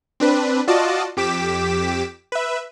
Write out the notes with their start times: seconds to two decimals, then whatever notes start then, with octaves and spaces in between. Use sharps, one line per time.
0.20 C4 D4 B4
0.68 F4 F#4 D5 D#5 A5
1.17 F2 G4 D6 B6 E7
2.32 B4 E5